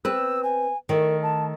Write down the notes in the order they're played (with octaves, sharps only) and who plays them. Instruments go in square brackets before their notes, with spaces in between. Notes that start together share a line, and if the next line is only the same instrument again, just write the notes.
[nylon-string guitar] C4 B4 [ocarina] E6
[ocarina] G#5
[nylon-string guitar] D#3 A3 [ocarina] A#4
[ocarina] A5